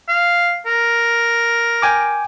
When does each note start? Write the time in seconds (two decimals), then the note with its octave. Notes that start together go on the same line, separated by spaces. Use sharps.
0.09 F5
0.66 A#4
1.82 G5 G#5 D6